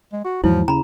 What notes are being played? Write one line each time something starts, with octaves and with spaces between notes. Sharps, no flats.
G#3
F#4
E2 G#2 F3 F#3 E4
D#2 C#3 A#5 B5